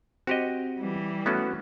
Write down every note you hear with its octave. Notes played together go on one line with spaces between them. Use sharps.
C4 F#4 G4 D#5
E3 G3
A3 B3 C#4 F#4